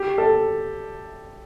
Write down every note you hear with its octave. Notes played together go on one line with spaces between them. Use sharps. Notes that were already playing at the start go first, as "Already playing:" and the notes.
Already playing: G4
A4